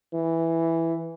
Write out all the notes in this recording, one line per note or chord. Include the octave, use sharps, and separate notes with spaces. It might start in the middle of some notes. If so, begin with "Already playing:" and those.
E3